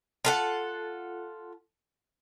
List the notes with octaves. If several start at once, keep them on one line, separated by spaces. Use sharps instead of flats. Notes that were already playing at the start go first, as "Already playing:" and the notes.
F4 A4 F#5